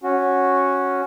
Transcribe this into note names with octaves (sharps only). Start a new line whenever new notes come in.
C#4 F#4